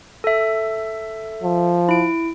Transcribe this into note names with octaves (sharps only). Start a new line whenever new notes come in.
A4 E5
F3
E4 D7